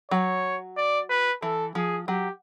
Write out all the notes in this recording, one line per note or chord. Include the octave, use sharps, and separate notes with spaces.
F#3 C#5
D5
B4
E3 A4
F3 G#4
F#3 G4